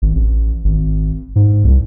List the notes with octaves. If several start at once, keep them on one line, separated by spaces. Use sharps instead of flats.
G#1
A1
G#1
G#2
C2